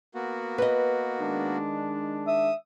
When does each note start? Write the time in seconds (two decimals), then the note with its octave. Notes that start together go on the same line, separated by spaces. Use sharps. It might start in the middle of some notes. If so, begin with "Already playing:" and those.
0.15 A#3 B3 F#4
0.58 B4 D#5
1.21 D#3 G#3 D4
2.27 E5 D#6